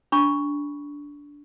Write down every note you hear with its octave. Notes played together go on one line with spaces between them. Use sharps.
D4 B5 C#6